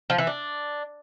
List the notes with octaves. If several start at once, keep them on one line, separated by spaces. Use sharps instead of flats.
F3
E3
D4